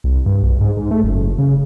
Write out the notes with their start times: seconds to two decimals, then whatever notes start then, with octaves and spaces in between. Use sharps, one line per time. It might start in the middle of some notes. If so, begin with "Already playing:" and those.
0.04 C2
0.26 G2
0.43 B1
0.61 G#2
0.77 G#2
0.91 A3
1.04 F#1
1.38 C#3